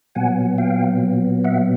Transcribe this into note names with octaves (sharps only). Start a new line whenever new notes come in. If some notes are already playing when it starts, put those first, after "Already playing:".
A#2 F#3 B3 F#5 G#5
F5 G5
E5 F#5